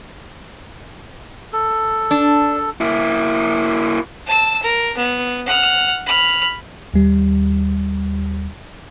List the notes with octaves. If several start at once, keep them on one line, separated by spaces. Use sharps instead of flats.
A4
D4
A#3 E4
A5 E6
A#4
B3
F#5 F6
B5 F6
D#2 G3